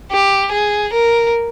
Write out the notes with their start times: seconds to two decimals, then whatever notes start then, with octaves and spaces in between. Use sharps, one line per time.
0.12 G4
0.52 G#4
0.93 A#4